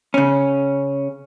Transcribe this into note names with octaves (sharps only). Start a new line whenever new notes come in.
C#3 C#4